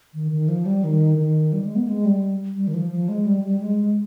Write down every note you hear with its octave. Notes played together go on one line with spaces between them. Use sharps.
D#3
D#3
F3
G3
D#3
D#3
G3
G#3
B3
G#3
G3
G3
D#3
F3
F3
G#3
G3
G3
G#3